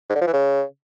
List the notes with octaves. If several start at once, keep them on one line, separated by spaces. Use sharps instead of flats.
G#2
D3
F3
E3
C#3